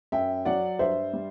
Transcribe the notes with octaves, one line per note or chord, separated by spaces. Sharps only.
F#2 E5 G5
F#3 D5 F#5
G2 C5 E5
G3